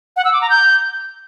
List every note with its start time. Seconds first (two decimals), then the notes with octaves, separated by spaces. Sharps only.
0.17 F#5
0.25 E6
0.33 D6
0.41 A#5
0.50 G6